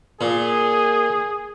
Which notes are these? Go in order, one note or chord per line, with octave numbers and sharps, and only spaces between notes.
A#2 G#4